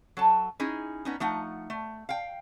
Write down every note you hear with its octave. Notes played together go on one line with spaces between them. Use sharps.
F#3 A4 A5
C#4 D#4 E4 G#4
B3 C#4 D#4
F3 A3 D#4 F#5
A3
F5 G5